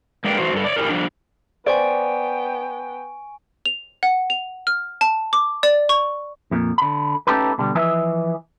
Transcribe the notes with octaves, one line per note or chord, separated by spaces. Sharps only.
G#3 A#3 D4 G4 B4 G5
E3 F#4 C5
G2 A4
C#5 D5
E4 G4 G#4 A#4
F3 G3 D4
B3 C5 D5 G5 G#5 C#6 D7
F7
F#5
F7
F6
A5
D6
D5
C#6
F2 A#2
D3 B5
A3 C#4 D#4 G4 A4 B4
B2 D3 G3
E3 F3 B4 D#5 E5 G#5